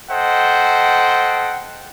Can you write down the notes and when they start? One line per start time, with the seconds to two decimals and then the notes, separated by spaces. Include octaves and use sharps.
0.11 A4 C5 D#5 F#5 G5